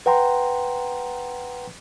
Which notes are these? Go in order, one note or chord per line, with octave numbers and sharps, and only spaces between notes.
B4 F#5 G5 A#5 C6